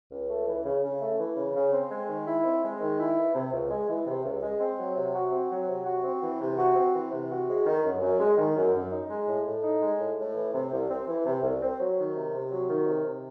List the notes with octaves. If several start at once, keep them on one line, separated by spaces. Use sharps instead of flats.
C#2
A3
E3
C#3
C#3
A3
E3
C#3
C#3
C4
G#3
D#3
E4
C4
G#3
D#3
E4
E3
C3
C#2
G#3
E3
C3
C#2
G#3
C4
F#3
C3
F#4
C4
F#3
C3
F#4
C4
E3
C3
F#4
C4
E3
C3
F#4
G#3
D#3
F#2
F#2
G#3
D#3
F#2
F#2
D#4
G#3
A2
A2
D#4
G#3
A2
A2
E3
C3
C2
C4
E3
C3
C2
C4
F#3
D#3
C3
C3
F#3
D#3
C3
C3